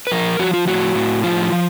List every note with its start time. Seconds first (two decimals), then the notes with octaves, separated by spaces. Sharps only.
0.07 B4
0.11 F3 A#4
0.39 F3 F#4
0.54 F4
0.67 A2 F#4
0.95 A2
1.24 F3 F4
1.52 F3